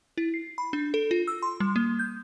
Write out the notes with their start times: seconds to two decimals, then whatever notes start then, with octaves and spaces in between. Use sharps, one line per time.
0.17 E4
0.34 C7
0.58 B5
0.73 D4
0.94 A4
1.11 F4
1.27 E6
1.42 C6
1.60 G3
1.76 A#3
1.99 G6